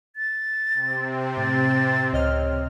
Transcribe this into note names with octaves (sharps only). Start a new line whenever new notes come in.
A6
C3 C4
A2 A6
C#2 C#5 D#5 F6